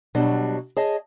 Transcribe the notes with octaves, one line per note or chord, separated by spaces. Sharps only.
B2 F#3 G3 D4
G#4 C#5 D#5 A5